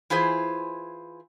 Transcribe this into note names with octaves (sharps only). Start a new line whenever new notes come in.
E3 E4 F4 G#4 C5